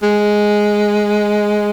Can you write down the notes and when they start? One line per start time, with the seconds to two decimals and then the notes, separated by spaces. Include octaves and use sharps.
0.03 G#3